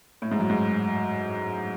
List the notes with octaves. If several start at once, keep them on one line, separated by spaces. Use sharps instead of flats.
A2
G#2
F#2
G#2